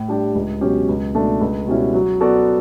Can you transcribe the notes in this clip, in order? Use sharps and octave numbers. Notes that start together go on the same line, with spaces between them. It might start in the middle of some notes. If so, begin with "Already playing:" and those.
Already playing: A2
G3 D4 G4
C#2
B2 F#3 C#4 G4
C#2
B2 A3 D4 A4
C#2
B2 G3 C#4 E4
F#3
B3 F#4 A4 D5